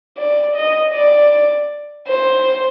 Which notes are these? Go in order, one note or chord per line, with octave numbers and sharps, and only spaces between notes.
D5
D#5
D5
C5